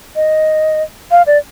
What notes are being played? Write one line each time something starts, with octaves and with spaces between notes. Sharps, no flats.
D#5
F5
D5